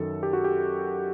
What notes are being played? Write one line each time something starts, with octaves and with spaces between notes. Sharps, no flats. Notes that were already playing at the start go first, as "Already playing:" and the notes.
Already playing: F#2 D#3 A4
G4
F#4
G4